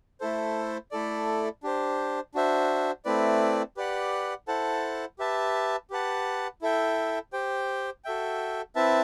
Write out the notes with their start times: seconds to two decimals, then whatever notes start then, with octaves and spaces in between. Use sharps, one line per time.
0.20 A3 E4 A4 C5
0.91 A3 E4 A4 D5
1.63 D4 G4 C5
2.34 D4 F#4 C5 E5
3.05 A3 C4 E4 B4 D5
3.77 G4 B4 D5 F#5
4.48 E4 A4 C5 F#5 A5
5.19 G4 B4 E5 A5
5.90 G4 B4 F#5 A5
6.62 E4 A4 E5 G5
7.33 G4 C5 G5
8.04 F#4 A4 E5 G5
8.75 C4 E4 B4 E5 A5